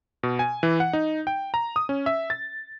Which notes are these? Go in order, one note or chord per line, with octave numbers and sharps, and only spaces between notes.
B2
G#5
E3
F#5
D#4
G5
A#5
D#6
C#4
E5
A6